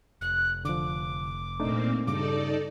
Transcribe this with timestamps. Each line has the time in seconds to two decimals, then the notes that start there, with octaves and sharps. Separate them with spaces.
0.21 F1 F#6
0.65 D3 F3 D6
1.60 A#2 A3 A#3 C4 D4 D#4
2.07 G2 C#3 D#4 A4 D5 D6